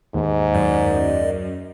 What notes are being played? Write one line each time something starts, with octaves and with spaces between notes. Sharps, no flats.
D#2 G#2
F#2 D5 D#5